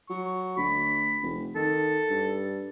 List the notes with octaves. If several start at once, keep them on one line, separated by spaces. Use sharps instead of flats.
F#3 C#6
D2 B5
F1
D#3 A4
G2